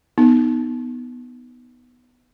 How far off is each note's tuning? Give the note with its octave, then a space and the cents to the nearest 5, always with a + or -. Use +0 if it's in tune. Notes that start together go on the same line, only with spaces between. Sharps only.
B3 +0 D#4 +0